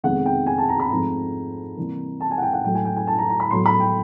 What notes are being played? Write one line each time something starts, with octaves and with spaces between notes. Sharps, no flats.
F2 C3 D#3 G#3 B3 F#5
G5
G#5
A5
A#5
B5
G#2 F3 A3 C4 A#5
C3 E3 G3 A#3
A5
G#5
F#5
G5
F#5
A2 F#3 A3 G5
G#5
G5
G#5
A5
A#5
A#5
B5
A2 F#3 B3 C6
B5
G5